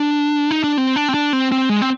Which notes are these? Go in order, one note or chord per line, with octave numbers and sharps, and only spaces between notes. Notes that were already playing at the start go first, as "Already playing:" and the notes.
Already playing: D4
D#4
D4
C4
D4
C4
D4
C4
C4
G#3
C4